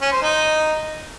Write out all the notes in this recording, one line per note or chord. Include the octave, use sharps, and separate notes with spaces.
C#4
C5
D#4